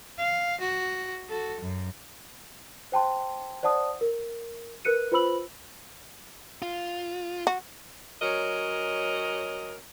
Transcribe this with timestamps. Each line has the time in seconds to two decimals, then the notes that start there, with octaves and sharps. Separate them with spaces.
0.18 F5
0.61 F#4
1.28 F#4 A4
1.61 F#2
2.92 C5 G5 A5 C6
3.63 C5 D5 F#5 A5 D#6
4.01 A#4
4.85 A#4 B4 F#6 C#7 D#7
5.12 F4 B4 C5 B5 E6 F#7
6.62 F4
7.47 F#4
8.21 F#3 C#4 A#4 D#5